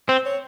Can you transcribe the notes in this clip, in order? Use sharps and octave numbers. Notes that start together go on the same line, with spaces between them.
C4 C5
C#5